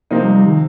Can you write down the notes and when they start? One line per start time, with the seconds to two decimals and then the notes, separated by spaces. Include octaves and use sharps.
0.11 C3 F3 A#3 C4 D#4 A#4
0.23 G3
0.34 G3
0.46 D#3